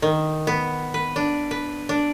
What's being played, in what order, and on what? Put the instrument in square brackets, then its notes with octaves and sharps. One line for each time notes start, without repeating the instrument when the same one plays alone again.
[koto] D#3
B3
B4
D4
B4
D4